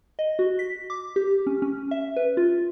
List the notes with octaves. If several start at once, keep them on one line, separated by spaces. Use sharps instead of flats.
D#5
F#4
B6
D6
G4
C#4
C#4
E5
B4
F4